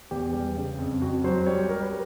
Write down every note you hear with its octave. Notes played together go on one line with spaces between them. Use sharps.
E2 G4
G3
C#3
F2
F2 F#4
F#3 C5
G3 C#5
G3 A#4
B4